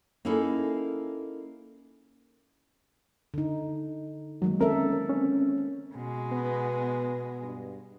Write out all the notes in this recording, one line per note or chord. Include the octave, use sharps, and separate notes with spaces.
A#3 C#4 D#4 E4 G#4 A4
D3 D#4
D#3 F#3 G#3 A#3
A#3 C4 C#4 A4 A#4 E5
C4 C#4
B2 G#3
B3
G2